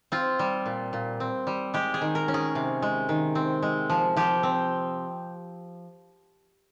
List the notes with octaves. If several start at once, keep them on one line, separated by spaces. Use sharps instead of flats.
C4 F4
G3
A#2
A#2
C4
G3
G#3 G4
G#4
D#3
A#4
C#4
G#4
C3
G#3
D#3
C4
G#3
F3
F3 G4
C4